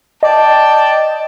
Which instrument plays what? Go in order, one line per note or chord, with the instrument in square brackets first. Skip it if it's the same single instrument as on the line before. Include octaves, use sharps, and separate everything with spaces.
[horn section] D5 G5 A5 [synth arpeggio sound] D#5